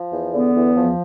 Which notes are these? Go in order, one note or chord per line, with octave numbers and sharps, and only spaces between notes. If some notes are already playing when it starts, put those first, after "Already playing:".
Already playing: F3
E2
D3 B3
E2
F3